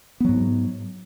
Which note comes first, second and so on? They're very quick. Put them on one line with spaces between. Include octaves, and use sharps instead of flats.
B3 F#3 G#2